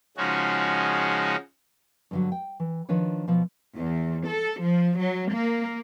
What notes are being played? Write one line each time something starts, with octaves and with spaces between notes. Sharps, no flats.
C#3 F3 G#3 C#4 D#4 F#4
G2 D3 F#3
G5
E3
D#3 F3 D4 B4 C#5
B2 F3
E2
A4
F3
F#3
A#3